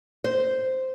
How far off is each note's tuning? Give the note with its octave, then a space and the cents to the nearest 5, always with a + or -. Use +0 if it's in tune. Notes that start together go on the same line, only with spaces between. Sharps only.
C5 -5